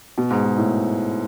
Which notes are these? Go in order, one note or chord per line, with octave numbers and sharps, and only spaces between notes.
B2
G#2
B2
A2